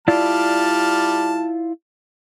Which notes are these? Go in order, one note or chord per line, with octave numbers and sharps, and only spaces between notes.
G3 E4 F4 D5 A5 F6